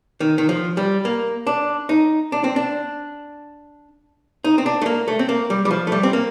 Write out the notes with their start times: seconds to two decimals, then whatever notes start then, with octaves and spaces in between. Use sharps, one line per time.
0.20 D#3
0.38 D#3
0.49 F3
0.77 G3
1.05 A#3
1.47 D4
1.89 D#4
2.32 D4
2.44 C4
2.56 D4
4.44 D#4
4.58 C4
4.66 D4
4.81 A3
4.86 A#3
5.08 A3
5.19 C4
5.29 A#3
5.50 G3
5.65 G3
5.71 F3
5.87 A3
5.92 G3
6.03 C4
6.13 A#3